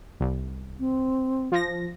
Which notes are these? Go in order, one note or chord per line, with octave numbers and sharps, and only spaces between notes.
C2
C4
F3 A#6